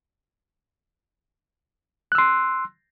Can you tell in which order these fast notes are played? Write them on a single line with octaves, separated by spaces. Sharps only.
F#6 E6 C6